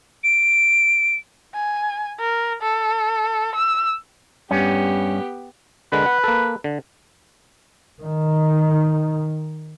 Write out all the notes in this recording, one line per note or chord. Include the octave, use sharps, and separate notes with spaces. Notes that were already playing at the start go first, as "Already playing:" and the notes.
D7
G#5
A#4
A4
E6
G2 B3 C#4 G4
D3 G#3 A#4 B4
F#5
A#3 A4
D3
D#3 D#4